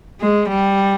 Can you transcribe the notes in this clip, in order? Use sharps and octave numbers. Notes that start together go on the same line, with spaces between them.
G#3
G3